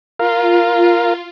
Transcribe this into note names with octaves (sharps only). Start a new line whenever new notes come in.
F4 A#4 F5